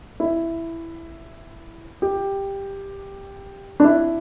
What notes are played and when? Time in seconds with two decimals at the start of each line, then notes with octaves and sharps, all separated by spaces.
0.20 E4
2.02 G4
3.80 D4
3.84 E4